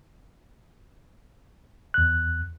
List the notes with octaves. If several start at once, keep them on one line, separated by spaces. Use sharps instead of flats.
E2 F#6